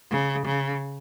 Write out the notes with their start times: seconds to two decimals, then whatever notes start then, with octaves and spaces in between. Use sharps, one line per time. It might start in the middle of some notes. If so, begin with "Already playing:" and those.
0.11 C#3
0.46 C#3